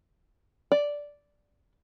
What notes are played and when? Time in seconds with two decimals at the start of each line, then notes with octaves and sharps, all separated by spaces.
0.72 D5